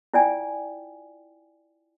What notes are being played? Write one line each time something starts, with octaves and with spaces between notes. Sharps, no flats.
E4 F4 D5 G5 G#5